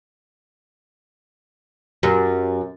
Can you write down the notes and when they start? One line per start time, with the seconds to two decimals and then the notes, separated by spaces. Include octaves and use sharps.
2.03 F#2 G4 A#4